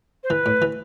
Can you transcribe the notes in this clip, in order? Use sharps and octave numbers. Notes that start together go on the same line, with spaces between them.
C5
E3 B4
A2
E3